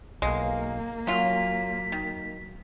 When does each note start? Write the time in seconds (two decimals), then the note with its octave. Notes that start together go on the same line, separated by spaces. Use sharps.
0.22 B1 G#3 A#3 F5
1.07 F#3 C#4 F4 B6
1.92 D#3